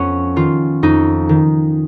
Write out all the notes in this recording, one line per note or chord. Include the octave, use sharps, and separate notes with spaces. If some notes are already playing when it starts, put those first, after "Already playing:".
Already playing: F2 B3 C#4
D#3 F4
F2 D#4
D#3